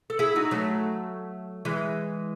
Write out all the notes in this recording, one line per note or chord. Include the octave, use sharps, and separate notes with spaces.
A4
E4 G#4
D#4 F#4
F#3 A3
E3 G#3